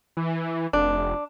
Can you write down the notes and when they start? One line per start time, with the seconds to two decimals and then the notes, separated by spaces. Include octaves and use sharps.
0.17 E3
0.73 F1 D4